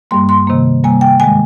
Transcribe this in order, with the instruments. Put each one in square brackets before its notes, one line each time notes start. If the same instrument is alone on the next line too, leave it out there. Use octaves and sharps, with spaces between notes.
[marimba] G2 G3 A#3 C6
C6
C3 D#3 A#3
C3 G3 A#3 G#5
G5
G#2 D#3 G#3 G#5